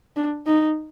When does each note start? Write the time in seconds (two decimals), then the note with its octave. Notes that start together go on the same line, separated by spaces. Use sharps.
0.16 D4
0.46 D#4